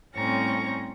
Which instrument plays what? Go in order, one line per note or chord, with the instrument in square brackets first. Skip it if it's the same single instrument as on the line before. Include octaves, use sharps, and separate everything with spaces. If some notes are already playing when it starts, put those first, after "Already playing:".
[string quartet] A2 G3 C4 C#4 A#5 C#6